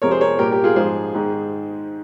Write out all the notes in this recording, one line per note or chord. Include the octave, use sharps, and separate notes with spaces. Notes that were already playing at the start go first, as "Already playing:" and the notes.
F2 C3 F3 G#3 A#4 C#5
G#4 C5
A#4 C#5
A#2 G3 G4 A#4
G4 A#4
F4 G#4
G#2 F3 G#3 G#4 C5
G#2 D#3 G#3